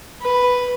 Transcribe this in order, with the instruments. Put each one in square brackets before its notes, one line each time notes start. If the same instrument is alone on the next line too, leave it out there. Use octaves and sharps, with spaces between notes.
[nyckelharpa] B4